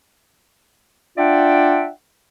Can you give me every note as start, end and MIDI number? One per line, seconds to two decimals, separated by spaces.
1.18 1.88 62
1.18 1.88 65
1.18 1.88 74
1.18 1.88 76
1.18 1.88 78
1.18 1.88 79